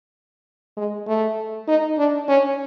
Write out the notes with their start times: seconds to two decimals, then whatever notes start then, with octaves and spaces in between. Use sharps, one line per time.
0.77 G#3
1.07 A3
1.68 D#4
1.98 D4
2.28 C#4